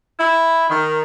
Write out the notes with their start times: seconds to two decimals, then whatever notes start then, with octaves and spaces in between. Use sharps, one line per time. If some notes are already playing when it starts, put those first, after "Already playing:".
0.20 E4
0.70 D#3